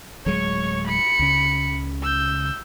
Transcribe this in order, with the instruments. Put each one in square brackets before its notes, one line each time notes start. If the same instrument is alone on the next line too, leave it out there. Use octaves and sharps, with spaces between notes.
[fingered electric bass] D1 F#3 G#3 [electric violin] C#5 C#6
[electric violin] B5 C#7
[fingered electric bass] C#2 C#3
[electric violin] E6 G6